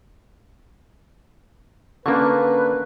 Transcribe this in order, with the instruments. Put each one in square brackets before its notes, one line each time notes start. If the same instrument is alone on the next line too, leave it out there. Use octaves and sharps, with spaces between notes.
[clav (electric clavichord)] D3 A#3 [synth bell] C#4 C#6 [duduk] B4